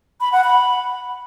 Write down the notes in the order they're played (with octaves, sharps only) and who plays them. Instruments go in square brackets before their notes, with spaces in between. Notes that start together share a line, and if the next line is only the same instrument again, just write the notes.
[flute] B5
F#5
B5